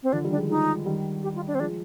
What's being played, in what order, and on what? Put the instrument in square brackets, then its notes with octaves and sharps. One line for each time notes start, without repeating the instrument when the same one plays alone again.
[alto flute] C4
[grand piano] D3 F3 [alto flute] D4
[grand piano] D#3 G3
[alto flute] D4
[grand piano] F3 G#3
[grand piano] F3 G#3 [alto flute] D#4
[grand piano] D#3 G3
[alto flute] G4
F4
D4
C4
[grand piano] F3 G#3 [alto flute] D4